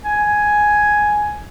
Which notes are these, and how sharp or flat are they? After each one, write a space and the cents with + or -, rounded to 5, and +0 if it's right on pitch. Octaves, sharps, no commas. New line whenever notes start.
G#5 +5